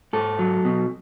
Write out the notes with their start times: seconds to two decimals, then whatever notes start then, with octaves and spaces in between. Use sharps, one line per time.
0.13 G#2 A4
0.39 F#3
0.65 B2